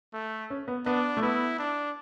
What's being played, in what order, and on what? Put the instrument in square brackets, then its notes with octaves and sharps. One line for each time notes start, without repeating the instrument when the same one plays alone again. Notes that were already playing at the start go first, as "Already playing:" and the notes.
[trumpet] A3
[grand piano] C#4
B3
[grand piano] B3 [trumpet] D4
[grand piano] A3
[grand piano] B3 [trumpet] E4
[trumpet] D4